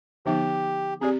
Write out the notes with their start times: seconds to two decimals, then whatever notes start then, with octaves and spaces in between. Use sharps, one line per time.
0.26 D3 F3 B3 D#4 G4
1.01 C4 G4 G#4 D5